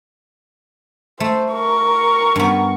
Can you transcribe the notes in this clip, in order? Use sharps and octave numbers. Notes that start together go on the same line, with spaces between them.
A3 C5
A#4 C#6
G2 B3